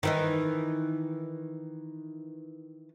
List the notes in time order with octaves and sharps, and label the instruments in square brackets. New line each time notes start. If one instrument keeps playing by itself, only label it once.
[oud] D#3 E3 D#4